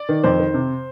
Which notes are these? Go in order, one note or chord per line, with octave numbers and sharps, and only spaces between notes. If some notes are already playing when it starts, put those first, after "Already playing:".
Already playing: D5
D#3
F2 C5
D#3
C3